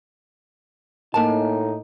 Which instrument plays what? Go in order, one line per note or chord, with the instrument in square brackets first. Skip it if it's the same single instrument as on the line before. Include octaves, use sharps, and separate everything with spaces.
[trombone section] A2 D#4 [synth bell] A#3 A#4 G#5 [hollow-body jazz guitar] A5